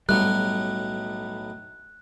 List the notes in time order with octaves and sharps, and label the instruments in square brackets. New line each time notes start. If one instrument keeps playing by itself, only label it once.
[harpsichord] B1 A2 F#3 [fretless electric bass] G3 [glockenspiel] F#6